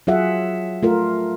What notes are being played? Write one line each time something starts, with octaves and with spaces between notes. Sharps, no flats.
F#3 F4 G#4 E5 F#5
A3 F4 A#4